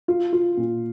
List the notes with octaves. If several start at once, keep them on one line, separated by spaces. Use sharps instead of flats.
F4
F4
A#2